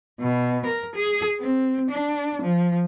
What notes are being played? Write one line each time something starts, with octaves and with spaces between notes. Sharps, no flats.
B2
A#4
G#4
C4
D4
F3